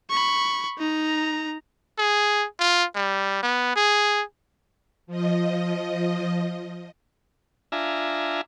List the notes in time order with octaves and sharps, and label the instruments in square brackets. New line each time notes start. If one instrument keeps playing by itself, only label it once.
[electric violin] B5 C#6
D#4 A#5
[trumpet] G#4
F4
G3
B3
G#4
[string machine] F3 D#5
[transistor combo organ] D4 F4 E5 G#5 A#5